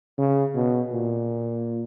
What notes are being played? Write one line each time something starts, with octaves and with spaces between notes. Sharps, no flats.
C#3
B2
A#2